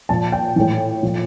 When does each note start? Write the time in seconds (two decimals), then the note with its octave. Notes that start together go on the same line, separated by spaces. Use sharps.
0.09 A#2 F3 A5
0.32 G5
0.56 A2 E3
1.02 A#2 F3